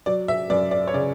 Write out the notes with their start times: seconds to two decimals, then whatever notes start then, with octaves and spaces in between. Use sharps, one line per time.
0.06 F#3 D5
0.28 E5
0.50 F#2 D5
0.71 D5
0.88 C#5
0.94 C#3 D5